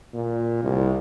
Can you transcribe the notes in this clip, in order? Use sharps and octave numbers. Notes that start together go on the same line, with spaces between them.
A#2
C2